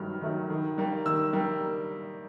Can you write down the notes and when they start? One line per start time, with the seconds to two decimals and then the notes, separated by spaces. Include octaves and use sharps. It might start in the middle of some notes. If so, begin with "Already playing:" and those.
Already playing: G2 D#3 F#3 A3 F6
0.21 D#3 F#3 A3
0.50 D#3
0.78 G3 A#3
1.06 D#3 E6
1.33 G3 A#3